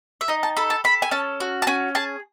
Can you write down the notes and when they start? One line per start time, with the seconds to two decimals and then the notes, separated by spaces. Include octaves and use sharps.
0.21 E5
0.28 D#4 D#5
0.43 A5
0.57 A4 B5
0.70 A5
0.84 A4 B5
1.02 G#5
1.11 C#4 A5
1.40 F#4
1.62 A5
1.67 C#4 G#5
1.95 G#4 A5